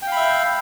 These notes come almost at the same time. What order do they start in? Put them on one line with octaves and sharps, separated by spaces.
G5 F5 B5 E5